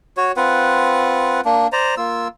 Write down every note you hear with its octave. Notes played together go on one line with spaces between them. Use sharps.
F#4 C#5
C4 F4 B4 F#5
A#3 D4
C5 D5 A#5
A#3 F4 E6